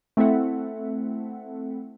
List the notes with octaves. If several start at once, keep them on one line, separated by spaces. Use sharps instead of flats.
A3 C4 E4 A4 E5 F#5